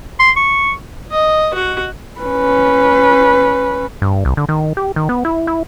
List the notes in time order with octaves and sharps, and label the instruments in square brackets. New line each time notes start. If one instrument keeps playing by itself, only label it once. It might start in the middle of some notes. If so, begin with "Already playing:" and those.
[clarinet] C6
C#6
[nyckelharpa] D#5
F#4
[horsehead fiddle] C#4 B4
[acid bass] G2
C2
D3
D#3
G4
D#3
B3
E4
E4